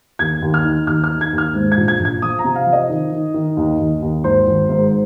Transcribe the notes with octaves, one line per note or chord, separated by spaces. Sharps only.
D#2 G#6
D#2
F6
D#3
D#2 F6
F6
D#3
G#6
D#2
F6
G#2
G#6
A#1
G#6
A#1
G#6
F3 D#6
A#5
C3
F5
F3
D#5
D#3
D#3
D#3
D#2
D#2
D#2
G#1 C5
G#1
G#2